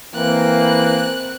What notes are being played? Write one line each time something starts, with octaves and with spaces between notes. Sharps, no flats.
E3 A#3 C4 F#6